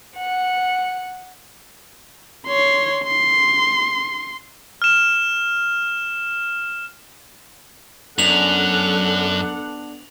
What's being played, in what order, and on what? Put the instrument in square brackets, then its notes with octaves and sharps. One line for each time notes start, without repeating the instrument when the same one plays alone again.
[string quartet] F#5
[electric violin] C#5 C6
C6
[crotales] F6 E7
[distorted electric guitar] F#2 [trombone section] B3 D4 [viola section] A4 F#5 [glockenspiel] F7 F#7